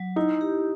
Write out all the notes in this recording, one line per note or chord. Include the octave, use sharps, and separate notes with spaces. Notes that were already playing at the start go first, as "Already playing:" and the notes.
Already playing: F#3
D#4 E4
G4